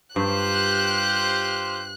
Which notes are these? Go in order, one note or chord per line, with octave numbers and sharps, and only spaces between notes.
G2 F4 G4 C5 F#6